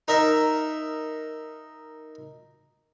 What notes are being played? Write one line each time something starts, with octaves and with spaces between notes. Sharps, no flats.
D#4 A#4 D#5 E5